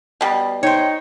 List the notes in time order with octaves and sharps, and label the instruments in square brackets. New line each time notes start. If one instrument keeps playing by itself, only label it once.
[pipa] B2 G3
[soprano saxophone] D#4 [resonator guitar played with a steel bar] C5 C#5 [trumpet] G5